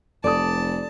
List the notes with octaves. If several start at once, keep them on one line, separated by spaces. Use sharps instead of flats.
F1 A4 D5 A5 D#6